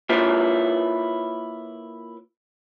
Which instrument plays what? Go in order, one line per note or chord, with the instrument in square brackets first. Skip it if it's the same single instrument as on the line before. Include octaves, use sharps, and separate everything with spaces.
[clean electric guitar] A#3 E4 F4 B4 C#5